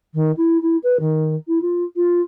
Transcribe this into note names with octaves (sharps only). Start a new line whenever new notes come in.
D#3
E4
E4
B4
D#3
E4
F4
F4